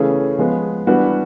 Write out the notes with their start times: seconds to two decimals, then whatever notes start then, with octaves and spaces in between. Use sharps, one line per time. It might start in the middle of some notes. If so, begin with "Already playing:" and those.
Already playing: C#3 E3 A3 C#4 G#4
0.38 F3 G#3 B3
0.87 E3 G3 B3 D4 F#4